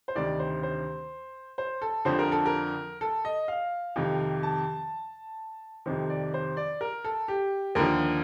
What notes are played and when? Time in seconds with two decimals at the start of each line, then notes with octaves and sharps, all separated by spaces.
0.08 C5
0.16 D2 C3 D#3 D5
0.39 C5
0.63 C5
1.58 C5
1.82 A4
2.05 F2 D3 F3 C5
2.19 A#4
2.32 A4
2.45 A#4
3.01 A4
3.25 D#5
3.48 F5
3.96 F2 C3 D#3
4.43 A5
5.86 F2 C3 D#3 C5
6.10 D5
6.34 C5
6.57 D5
6.81 A#4
7.04 A4
7.28 G4
7.75 D#2 D3 F3 A#4